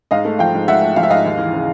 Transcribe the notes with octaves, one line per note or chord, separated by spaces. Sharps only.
G#2 D#5 F5
A3
F3 F5 G5
G#2
G#2 E5 F#5
A3
F3 F5
E5
G#2 D#5 F5
D#2
E3
C#3